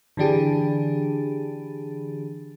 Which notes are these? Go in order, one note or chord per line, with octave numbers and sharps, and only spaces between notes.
D3 E3 D4 G4 G#4